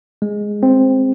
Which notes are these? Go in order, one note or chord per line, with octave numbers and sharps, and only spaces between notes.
G#3
C4